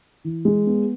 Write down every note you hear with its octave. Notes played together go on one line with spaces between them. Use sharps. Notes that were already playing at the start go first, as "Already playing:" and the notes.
E3
G#3
B3